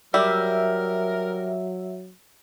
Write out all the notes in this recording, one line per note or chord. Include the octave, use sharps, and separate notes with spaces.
F#3 G3 A#4 E5